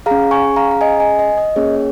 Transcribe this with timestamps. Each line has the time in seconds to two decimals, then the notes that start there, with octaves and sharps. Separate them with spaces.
0.06 G#4 F5 A#5
0.11 C#4
0.31 G#5 C#6
0.56 F5 A#5
0.71 A#5
0.81 D#5 G#5
1.00 D#5 G#5
1.19 D#5
1.38 D#5
1.56 A#3 C#4 G#4 C#5